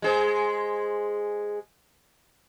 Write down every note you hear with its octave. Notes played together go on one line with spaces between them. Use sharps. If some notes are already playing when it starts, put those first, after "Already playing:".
G#3 G#4 C5